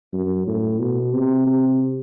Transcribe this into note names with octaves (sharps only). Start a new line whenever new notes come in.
F#2
A2
B2
C3
C3